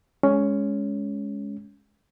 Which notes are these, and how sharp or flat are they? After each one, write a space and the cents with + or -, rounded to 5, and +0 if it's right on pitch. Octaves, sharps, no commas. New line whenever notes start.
G#3 +0 C#4 +10